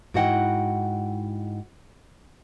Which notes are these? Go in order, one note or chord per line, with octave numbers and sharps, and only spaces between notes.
G#2 E4 F#4 D#5 F#5 G5